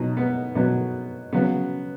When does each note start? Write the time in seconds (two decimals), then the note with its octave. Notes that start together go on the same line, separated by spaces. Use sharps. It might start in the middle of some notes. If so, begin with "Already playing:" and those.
Already playing: B2 F#3 D#4
0.17 B3
0.55 B2 F#3 B3
1.33 C#3 F#3 B3